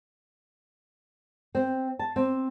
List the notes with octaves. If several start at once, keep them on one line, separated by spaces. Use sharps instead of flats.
C4
A5
C4